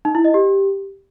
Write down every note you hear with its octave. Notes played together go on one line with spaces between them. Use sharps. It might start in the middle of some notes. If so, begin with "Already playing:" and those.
D#4
E4
D#5
G4